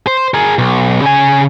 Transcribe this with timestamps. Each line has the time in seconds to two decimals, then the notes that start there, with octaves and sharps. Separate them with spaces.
0.07 C5
0.34 G#4 A#4
0.58 B1
1.02 C#3 G#5